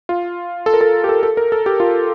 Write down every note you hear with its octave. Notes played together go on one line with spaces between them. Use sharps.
F4
A4
A#4
A4
G4
A4
A4
A#4
A4
G4
F4